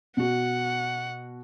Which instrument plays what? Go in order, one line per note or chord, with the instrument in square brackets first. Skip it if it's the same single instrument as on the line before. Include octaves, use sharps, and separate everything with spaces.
[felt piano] B2 F#4 [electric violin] F#5